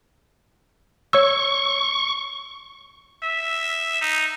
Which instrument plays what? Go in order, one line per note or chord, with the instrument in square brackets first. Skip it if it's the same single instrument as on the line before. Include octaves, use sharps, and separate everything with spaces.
[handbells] C#5 E6 [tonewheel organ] C#6
[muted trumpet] E5
D#4